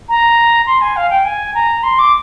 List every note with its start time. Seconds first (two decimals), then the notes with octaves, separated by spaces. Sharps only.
0.09 A#5
0.67 C6
0.81 G#5
0.96 F5
1.10 G5
1.25 G#5
1.55 A#5
1.83 C6
1.99 D6